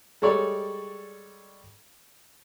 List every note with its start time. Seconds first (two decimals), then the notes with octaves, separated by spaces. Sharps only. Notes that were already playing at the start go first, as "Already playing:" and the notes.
0.22 G3 G#3 A4 C#5 D5